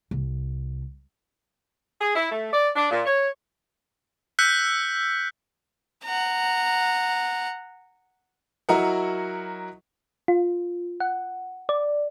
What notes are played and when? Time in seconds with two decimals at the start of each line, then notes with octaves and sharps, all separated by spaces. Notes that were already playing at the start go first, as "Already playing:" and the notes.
0.11 C2
2.00 G#4
2.15 E4
2.31 A3
2.52 D5
2.74 D4
2.90 A#2
3.04 C#5
4.39 E6 F#6 G6 B6 C#7
6.04 F#5 A#5
8.69 F#3 E4 F#4 A#4 D#5 F#5
10.28 F4
11.00 F#5
11.69 D5